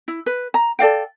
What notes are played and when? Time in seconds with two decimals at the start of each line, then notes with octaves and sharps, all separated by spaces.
0.08 E4
0.26 B4
0.54 A#5
0.79 A4 D5 F5 G5